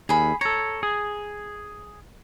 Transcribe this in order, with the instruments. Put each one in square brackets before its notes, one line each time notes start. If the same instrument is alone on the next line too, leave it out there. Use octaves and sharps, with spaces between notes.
[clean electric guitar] D#2 [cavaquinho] G#4 B5
[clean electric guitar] A4 C#5 [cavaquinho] A#5
[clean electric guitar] G#4